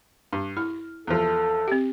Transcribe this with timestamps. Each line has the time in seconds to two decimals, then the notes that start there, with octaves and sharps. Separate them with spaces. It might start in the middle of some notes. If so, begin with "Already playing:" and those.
0.33 G2
0.57 E4 F6
1.07 E2 F3 A4
1.68 C4 G4